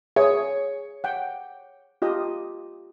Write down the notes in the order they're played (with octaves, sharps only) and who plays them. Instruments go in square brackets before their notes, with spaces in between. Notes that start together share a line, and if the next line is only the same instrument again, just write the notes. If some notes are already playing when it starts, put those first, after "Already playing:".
[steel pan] G#4 [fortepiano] C#5
[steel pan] F#5 G5
F4 G4 D#5